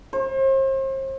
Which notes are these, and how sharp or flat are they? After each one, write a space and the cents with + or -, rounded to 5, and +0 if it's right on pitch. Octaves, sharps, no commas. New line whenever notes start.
C5 +40